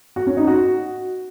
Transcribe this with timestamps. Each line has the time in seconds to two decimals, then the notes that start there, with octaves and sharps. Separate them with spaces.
0.16 F#4
0.27 C#4
0.37 D#4
0.48 F#4